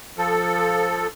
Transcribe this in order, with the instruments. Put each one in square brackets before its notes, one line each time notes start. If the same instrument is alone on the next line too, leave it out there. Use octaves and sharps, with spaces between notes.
[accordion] F3 A4